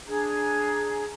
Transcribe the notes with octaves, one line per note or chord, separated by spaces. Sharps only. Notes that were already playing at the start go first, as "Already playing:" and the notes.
D4 G#4 A#5 G#6